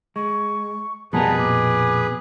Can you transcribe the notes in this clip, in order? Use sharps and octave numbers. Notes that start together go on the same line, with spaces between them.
G#3 C#6
F2 B2 G3 F#4 G#4 A#4 B4 A5
A#2 D6